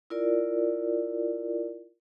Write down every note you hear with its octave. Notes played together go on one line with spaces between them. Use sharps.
E4 F4 A#4 D5